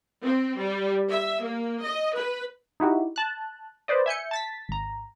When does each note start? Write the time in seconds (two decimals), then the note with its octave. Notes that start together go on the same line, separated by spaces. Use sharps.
0.24 C4
0.59 G3
1.10 E5
1.41 A#3
1.82 D#5
2.14 B4
2.80 D#4 E4 F#4 G4
3.16 A5 F#6
3.88 B4 C5 D5 D#5
4.06 E5 G#5 G6 C#7
4.31 A5 A6 B6
4.69 G#1 A#5